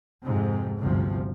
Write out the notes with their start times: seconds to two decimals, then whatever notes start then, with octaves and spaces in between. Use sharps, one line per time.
0.24 F2 G#2 C3
0.79 G1 D2 C3 F3